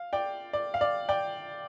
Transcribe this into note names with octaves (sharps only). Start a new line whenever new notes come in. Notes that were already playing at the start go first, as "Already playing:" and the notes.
Already playing: F5
D5 G5
D5
F5
D5
D5 G5